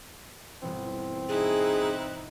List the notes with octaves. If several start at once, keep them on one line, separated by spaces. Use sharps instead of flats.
G1 B2 E3 C4
D#4 E4 G#4 F#6